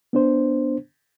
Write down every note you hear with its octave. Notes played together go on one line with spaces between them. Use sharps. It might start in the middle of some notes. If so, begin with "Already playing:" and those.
B3 D4 C5